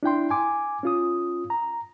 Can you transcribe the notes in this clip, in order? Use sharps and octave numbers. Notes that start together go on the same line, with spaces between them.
D4 E4 G5 C6
G#5 D6
C#4 F4 D#6
A#5